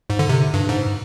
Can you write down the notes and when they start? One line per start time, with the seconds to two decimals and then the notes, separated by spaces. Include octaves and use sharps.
0.10 G#2
0.19 D3
0.29 C3
0.54 G2
0.69 G#2